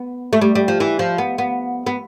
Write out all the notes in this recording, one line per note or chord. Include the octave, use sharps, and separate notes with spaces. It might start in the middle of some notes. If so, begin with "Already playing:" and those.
Already playing: B3
A3
G3
G3
F3
E3
F3
B3
B3
B3